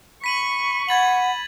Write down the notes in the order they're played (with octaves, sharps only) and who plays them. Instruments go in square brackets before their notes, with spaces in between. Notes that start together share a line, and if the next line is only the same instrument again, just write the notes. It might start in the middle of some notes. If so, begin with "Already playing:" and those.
[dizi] B5 [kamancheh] C#6 [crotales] B6 D#7 F#7
[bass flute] F#5 [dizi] B5 [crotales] G#6 A6 F#7